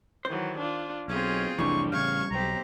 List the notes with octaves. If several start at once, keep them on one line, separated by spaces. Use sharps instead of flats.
D#3 E3 F#3 C5
D4 F4
B1 C4 C#4 F4 G#4
F1 C2 E3 G3 A3 D4 C#6
A1 C#3 G3 F5 C#6 G#6
B1 C4 G4 A#5